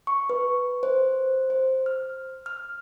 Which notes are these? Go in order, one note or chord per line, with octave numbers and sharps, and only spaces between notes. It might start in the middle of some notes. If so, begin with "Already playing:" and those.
C#6
B4
C5
C5
F6
F6